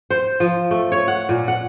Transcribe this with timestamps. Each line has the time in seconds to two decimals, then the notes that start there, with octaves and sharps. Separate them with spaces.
0.10 C5
0.40 F3
0.71 A3
0.92 C#5
1.08 F#5
1.29 A#2
1.48 F#5